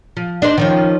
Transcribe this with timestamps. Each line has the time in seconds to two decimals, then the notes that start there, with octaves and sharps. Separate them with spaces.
0.17 F3
0.42 D4 D#4 C5
0.58 D#3 F3 C#4